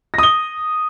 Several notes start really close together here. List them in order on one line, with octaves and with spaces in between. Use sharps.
A#6 D#6 G7